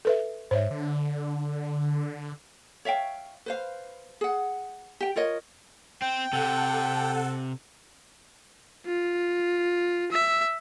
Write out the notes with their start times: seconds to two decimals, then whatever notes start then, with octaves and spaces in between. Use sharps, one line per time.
0.05 A4 B4 E5
0.51 G#2 C5 C#5 E5
0.71 D3
2.85 C#5 E5 F5 G5
3.46 B4 C5 F5
4.21 G#4 F#5
5.00 G4 G5
5.16 F4 A#4 C#5 D#5
6.02 C4 G5
6.33 C3 A4 F#5
8.86 F4
10.12 E5